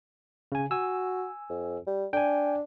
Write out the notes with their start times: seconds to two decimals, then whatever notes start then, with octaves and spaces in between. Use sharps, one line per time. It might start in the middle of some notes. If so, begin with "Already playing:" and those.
0.52 C#3 G#5
0.71 F#4 G#5 E6
1.49 F2
1.87 G3
2.13 D4 G5 G#5